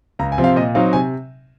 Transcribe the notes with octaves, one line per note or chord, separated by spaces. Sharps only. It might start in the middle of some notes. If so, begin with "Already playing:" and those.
C#2 A#5
G#5
C3 F3 C4
F5
A#2 D#5
F#3 C4 D#4 F5
C3 G#5